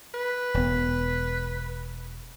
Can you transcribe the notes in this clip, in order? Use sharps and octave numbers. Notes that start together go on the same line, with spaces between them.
B4
E1 B3